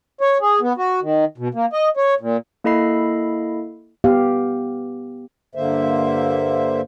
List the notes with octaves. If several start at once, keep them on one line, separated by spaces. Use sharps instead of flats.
C#5
G#4
B3
F#4
D#3
B2
A#3
D#5
C#5
A#2
A#3 E4 A4 D#5 B5 C7
B3 G4 F5
G2 D3 A#3 C5 E5